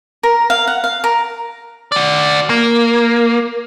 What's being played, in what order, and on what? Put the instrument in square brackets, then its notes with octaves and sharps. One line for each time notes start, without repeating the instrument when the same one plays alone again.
[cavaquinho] A#4
F5
F#5
F5
A#4
[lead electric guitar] F#4 D5
A#3